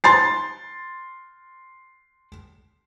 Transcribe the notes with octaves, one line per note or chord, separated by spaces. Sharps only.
C6 A6 C7